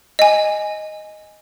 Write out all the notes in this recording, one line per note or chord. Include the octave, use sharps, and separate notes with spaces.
D#5 G#5